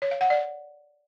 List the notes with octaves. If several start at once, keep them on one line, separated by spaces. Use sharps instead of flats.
C#5
F5
F#5
D5